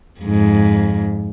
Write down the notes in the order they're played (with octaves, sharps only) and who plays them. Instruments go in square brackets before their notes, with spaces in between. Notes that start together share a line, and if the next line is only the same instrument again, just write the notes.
[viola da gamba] F2 G#2